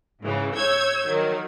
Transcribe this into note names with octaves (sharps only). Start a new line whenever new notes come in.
G#2 C#3 E3
C#5 E6 G6 G#6
D#3 F#3